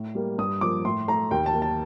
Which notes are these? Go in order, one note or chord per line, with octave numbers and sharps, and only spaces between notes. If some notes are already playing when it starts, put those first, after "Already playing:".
Already playing: A2
G3 A#3
G2 D#6
F3 A#3 D6
A2 C6
A3 A#5
D#2 G5
A5
D#3 A#3
A5